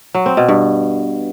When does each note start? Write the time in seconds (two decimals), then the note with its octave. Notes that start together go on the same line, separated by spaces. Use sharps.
0.15 F#3
0.26 C4
0.37 B2
0.49 G2